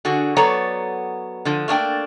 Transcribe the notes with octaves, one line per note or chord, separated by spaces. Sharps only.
D3 F#4 G#4
F#3 B3 A4 C#5 D5 A#5
D3 F3
A3 A#3 D4 G5